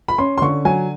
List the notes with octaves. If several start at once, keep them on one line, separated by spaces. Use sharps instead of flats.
B5
C#4 C6
C6
D3 C#6
F#3 G#5